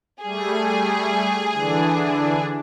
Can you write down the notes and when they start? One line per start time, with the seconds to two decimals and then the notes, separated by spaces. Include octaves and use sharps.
0.23 G3 A3 G#4
1.52 D3 E3 D4